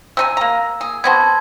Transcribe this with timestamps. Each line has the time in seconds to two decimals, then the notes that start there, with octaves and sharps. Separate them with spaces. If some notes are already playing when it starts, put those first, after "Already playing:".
0.17 C3 D#4 G#5 E6
0.37 A#3 A#5
0.81 G#4
1.04 B3 C4 F#4 A5 C6 G#6